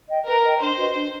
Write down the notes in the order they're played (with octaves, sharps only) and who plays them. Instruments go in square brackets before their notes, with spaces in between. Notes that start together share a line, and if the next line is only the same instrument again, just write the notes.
[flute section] D#5 G5
[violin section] A#4 [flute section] B4
[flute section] D#5 G5
[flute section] D4 [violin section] C5
[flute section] F#4 B4 D#5
D4